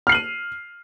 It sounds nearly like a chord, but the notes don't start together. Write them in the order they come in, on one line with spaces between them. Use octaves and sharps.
F6 C7 F#7 D#7